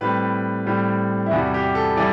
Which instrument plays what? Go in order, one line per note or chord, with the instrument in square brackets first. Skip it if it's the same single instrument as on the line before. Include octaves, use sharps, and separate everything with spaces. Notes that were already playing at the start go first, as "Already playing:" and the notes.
[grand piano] A2 G3 C4 B4
A2 G3 C4
E4
E2 C3 E3 G3 F#4
G4
A4
E3 G3 D5